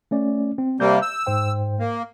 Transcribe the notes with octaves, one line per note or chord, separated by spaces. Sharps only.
A3 C#4 D5
C4
C3 G3 A#3 G6
E6
G#2 C5 G5
A#3